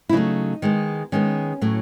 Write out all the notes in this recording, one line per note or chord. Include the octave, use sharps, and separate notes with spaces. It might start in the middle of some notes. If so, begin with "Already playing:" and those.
E4
C#3 F#3 A3 B3 D#4
D#3 G#3 B3
D#3 G#3 B3 C#4
A2 F#3 A3